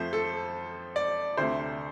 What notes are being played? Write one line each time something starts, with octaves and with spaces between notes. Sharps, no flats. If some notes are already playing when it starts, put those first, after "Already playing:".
Already playing: F2 F3 A3 C5
A4
D5
D2 C3 A3 C5